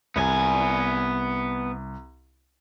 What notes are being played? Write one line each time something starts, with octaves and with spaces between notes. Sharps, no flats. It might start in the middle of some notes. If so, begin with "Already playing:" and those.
C2 B3 G#5